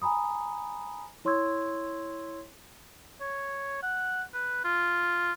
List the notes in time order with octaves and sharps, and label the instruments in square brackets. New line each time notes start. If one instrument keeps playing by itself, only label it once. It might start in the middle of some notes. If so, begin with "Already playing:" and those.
[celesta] G#5 A#5 B5 D#6
E4 C#5 C6 C#6 E6 G#6
[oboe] C#5
F#5
B4
F4